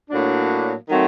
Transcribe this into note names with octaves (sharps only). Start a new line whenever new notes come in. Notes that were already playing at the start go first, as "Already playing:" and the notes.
A2 F#3 A#3 D4
D#3 F#3 A3 C4